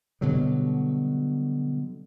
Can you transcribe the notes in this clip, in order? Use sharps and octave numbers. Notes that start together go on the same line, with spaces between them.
B2 D3 F#3 G3